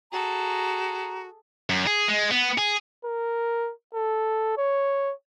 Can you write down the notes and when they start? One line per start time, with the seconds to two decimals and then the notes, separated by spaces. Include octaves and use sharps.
0.12 F#4 G#4 A4 A#5
1.70 F#2
1.87 G#4
2.09 G#3
2.31 B3
2.58 G#4
3.05 A#4
3.95 A4
4.58 C#5